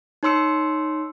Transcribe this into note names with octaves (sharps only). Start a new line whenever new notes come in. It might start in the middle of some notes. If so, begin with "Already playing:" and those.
D#4 C#5 C6 E6 C#7